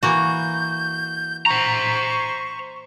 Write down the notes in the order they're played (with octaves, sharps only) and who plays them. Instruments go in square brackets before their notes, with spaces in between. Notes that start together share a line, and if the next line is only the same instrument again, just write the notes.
[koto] E3 A#3 F#4 [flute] G6
[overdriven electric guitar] C5 A#5 [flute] C#6